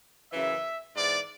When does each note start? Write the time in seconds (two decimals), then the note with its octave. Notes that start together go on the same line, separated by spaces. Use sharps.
0.31 F#2 C#3 E3 E5
0.96 G#2 E3 D5